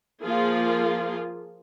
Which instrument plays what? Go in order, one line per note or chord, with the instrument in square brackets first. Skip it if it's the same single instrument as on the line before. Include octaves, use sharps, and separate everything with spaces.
[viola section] F3 A#3 F4 G#4